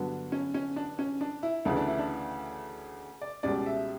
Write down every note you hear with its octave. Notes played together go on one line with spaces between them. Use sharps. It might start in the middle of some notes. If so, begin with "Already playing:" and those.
Already playing: G2 D3 F#3 B3 D4
C#4
C#4
D4
C#4
D4
E4
D2 C#3 E3 D4
D4
E4
D4
D5
C#2 B2 G3 C#4 D5
E5